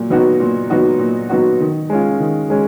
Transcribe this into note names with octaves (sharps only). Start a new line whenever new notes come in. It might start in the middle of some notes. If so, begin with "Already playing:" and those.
Already playing: A#2 F#3
F#3 B3 D#4 F#4
A#2
F#3 B3 D#4 F#4
A#2
F#3 B3 D#4 F#4
D#3
G#3 C#4 F4
D#3
G#3 C#4